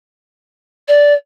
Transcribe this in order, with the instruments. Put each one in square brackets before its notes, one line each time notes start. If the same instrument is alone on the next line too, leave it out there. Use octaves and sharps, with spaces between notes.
[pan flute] D5